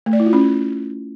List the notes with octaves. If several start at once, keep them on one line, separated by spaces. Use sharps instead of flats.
A3
D5
E4
F4
C#4